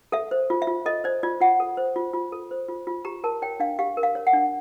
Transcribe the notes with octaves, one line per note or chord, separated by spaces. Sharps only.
A4 E5
C5
F4
E5
F4
A4 D#5
C5 D5
F4 D5
F4 F#5
A4
C5
F4
F4
A4
C5
F4
F4
G4 A#5
A#4 A5
C#5 G5
D4 F5
G4 F5
A#4
F5
C#5
F#5
D4